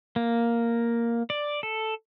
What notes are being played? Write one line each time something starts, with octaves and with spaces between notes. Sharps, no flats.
A#3
D5
A4